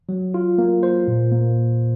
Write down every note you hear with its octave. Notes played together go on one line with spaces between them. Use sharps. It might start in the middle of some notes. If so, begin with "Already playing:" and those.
F#3
F4
A#3
C5
A#2
A#3